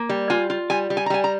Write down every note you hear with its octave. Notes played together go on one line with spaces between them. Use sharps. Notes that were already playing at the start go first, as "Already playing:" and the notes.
Already playing: A#3
G3
F4 G#5
F4
G3 G#5
G3
G#5
A#5
G3 G#5
A#5